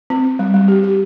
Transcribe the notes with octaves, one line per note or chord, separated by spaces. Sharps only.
C4
G3
G3
G4
G4